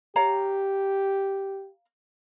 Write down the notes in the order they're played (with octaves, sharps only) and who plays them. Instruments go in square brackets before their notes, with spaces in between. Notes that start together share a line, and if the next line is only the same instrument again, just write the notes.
[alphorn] G4 [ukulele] C#5 F5 A#5